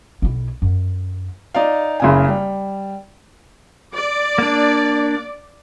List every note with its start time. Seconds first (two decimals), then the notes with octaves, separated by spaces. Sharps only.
0.22 B1 E4
0.62 F#2
1.54 D#4 D5 F5
2.00 F#1 C#3 G#5
2.28 G3
3.93 D5
4.38 A#3 D4